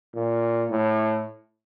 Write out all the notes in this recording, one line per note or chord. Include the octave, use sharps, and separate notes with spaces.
A#2
A2